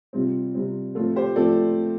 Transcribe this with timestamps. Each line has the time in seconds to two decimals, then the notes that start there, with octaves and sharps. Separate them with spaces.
0.13 C3 G3 C4 F4
0.55 C3 G3 C4
0.95 A2 F3 A3 C4 F4 A4
1.16 G4 C5
1.36 A2 F3 A3 C4 A4 D5